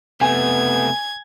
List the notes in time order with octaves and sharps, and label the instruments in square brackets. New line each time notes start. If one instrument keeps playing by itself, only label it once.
[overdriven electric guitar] C3 A3 [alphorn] B3 [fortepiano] G#5 [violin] G#6